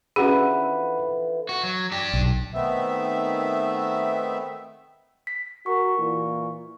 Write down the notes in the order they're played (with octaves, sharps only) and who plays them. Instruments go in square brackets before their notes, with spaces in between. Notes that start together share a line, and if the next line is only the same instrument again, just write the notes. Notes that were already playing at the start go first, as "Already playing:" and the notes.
[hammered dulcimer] D3 E3 F3 [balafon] C#4 F#4 G#4 [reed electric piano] F#5 B5
[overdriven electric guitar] F#4
F#3
D4 G4
[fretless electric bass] B1
[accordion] D#3 A3 B3 C4 E5
[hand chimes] B6
[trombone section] F#4 A#4 [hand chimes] C#6
[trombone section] A#2 E3